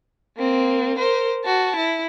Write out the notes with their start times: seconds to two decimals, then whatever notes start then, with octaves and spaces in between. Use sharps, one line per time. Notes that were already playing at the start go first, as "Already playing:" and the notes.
0.38 A#3 C4
0.98 A#4 C5
1.44 F#4 A5
1.76 E4